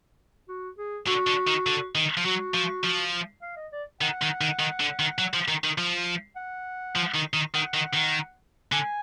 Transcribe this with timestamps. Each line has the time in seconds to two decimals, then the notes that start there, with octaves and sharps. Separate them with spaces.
0.49 F#4
0.78 G#4
1.07 D3 F#4
1.27 D3
1.47 D#3
1.66 D3
1.95 D#3
2.17 F3
2.25 F#3 F#4
2.54 F3
2.83 F3
3.42 F5
3.57 D#5
3.72 D5
4.01 D#3 F#5
4.21 D#3
4.41 D#3
4.60 D#3
4.80 D3
4.99 D#3
5.18 F#3
5.33 F3
5.48 D#3
5.64 D#3
5.78 F3
6.36 F#5
6.96 F3
7.15 D#3
7.34 D#3
7.55 D#3 F#5
7.74 D#3
7.94 D#3
8.72 D3 G#5